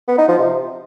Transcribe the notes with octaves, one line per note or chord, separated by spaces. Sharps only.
B3
D#4
F3
C3